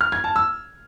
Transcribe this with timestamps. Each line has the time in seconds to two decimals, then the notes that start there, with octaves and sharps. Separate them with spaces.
0.01 F6
0.12 G#6
0.24 A5
0.36 E6